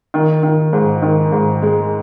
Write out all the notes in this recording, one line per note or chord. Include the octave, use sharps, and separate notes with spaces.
D#3
D#3
G#2
D#3
G#2
G#3